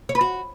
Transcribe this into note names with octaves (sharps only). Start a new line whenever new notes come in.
C#5
B4
F#4